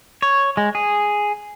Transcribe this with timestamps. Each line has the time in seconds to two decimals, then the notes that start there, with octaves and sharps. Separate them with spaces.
0.22 C#5
0.57 G#3
0.75 G#4